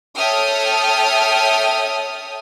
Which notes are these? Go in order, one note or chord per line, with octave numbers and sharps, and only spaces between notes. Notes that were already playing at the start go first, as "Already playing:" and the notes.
A4 C#5 E5 G5 D#6 F6